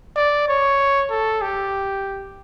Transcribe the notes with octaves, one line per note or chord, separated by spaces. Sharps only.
D5
C#5
A4
G4